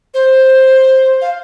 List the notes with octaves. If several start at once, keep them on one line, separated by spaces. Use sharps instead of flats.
C5
F5